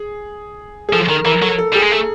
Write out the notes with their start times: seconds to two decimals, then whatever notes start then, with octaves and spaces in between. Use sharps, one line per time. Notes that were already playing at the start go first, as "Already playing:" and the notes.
Already playing: G#4
0.89 G#4
0.92 F3 A4
1.09 D#3 A#4
1.25 E3 A#4
1.42 F#3 A4
1.58 A4
1.73 G3 G#4
1.82 G#3
1.91 A3 A4